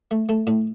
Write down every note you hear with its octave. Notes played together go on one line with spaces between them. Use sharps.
A3
A3 A4
A2